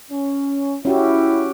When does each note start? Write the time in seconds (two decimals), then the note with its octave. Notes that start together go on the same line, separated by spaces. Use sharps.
0.11 C#4
0.85 C#4 E4 F#4 G4